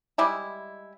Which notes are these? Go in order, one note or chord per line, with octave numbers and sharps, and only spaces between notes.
G3 G#3 E4